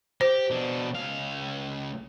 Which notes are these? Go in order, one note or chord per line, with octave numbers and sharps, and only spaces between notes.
G4 C5
B2 D4
C#2 F5